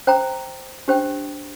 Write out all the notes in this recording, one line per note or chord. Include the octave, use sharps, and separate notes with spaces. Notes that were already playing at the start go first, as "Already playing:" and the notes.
C5 G5 A#5
D4 G4 C5 G5